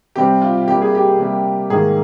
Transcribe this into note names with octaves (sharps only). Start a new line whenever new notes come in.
C3 G3 C4 G4
F4
C3 G3 A#3 G4
G#4
G4
C3 G3 A#3
G#2 D#3 A#3 G#4